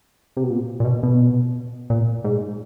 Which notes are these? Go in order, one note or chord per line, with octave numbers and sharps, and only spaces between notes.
C3
B2
A#2
A#2
B2
B2
A#2
G#2